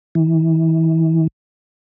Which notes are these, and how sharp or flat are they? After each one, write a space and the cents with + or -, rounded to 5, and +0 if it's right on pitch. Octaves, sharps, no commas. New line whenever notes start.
E3 -30